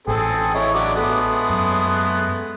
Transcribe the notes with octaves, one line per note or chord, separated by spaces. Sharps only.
A1 C4 G#4 A4
E4 C#5 D#5
F#3 D4 D6
G#3 A3 B3
F#2